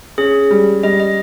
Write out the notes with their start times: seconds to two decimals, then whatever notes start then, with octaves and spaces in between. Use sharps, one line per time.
0.18 C#4 G#4
0.51 G3
0.83 G3 D#5
1.00 D#5